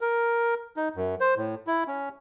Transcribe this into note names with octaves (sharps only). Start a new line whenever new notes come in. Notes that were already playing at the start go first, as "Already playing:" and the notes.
A#4
D#4
F#2
C5
A2
E4
C#4